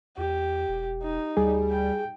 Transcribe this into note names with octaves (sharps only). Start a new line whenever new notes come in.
E2 G4
E1
D#4
D2 G3 G#4
G5